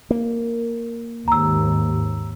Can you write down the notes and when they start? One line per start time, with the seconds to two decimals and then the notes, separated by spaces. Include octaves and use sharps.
0.11 A#3
1.28 D#2 G#2 A#5 E6